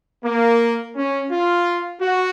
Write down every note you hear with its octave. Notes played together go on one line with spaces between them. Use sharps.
A#3
C#4
F4
F#4